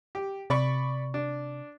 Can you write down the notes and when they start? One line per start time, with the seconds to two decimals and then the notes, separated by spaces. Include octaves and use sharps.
0.15 G4
0.50 C3 D5 B5 C#6
1.14 D4